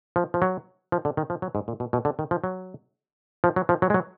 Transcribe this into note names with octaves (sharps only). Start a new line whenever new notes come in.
F3
F3
F#3
F3
D3
D#3
F3
F#3
G#2
A#2
B2
B2
D3
D#3
F3
F#3
F3
F#3
F3
F#3
G#3
F#3